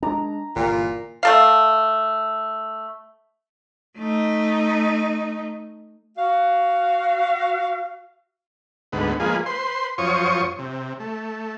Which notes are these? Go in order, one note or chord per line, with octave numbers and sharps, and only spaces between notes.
G#3 D4 A#5
G1 A#2 E3
A3 A4 F5
A3 D#4
F#4 F5
D2 G#2 B3
F3 G#3 A#3 G#4 B4
B4 C5 C6
F#2 F3 C5 C#5 C#6 D#6
C3
A3